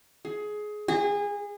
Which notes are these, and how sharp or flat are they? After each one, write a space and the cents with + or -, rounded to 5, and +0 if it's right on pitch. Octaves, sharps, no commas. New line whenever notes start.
G#4 +20
G#4 -25